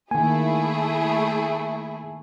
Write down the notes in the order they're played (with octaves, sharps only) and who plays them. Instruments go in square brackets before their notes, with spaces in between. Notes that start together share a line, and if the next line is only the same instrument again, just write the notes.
[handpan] D#3 A#3 [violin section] A3 E4 G#4 [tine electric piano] G#5